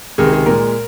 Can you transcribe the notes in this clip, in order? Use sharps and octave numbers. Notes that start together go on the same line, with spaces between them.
C#2 C3 D#3 G#3 G#4
G#4
A#2 G#3 A#4